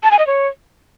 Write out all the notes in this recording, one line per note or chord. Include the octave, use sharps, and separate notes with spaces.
A5
G#5
D#5
C#5